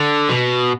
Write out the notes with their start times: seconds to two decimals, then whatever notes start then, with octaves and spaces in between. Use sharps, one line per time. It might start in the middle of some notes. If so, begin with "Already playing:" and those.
Already playing: D3
0.29 B2